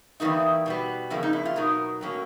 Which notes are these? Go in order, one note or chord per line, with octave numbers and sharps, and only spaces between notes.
E2 C#3 E3 G3 A#3 D#4
B2 G3 B3
F2 C#3 F3 A#3 E4
D#4
E4
F4
B2 F#3 B3 D#4 A#4
A2 F#3 A#3 C#4